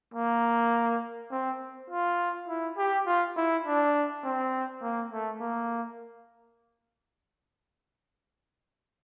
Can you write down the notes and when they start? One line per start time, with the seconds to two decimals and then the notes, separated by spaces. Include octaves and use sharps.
0.14 A#3
1.31 C4
1.90 F4
2.48 E4
2.78 G4
3.06 F4
3.36 E4
3.66 D4
4.24 C4
4.82 A#3
5.11 A3
5.40 A#3